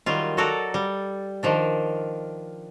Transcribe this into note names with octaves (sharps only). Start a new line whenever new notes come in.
D#3 F#3 G3 F4
F#3 F#4 A4 D5 A#5
G3
D#3 F3 D4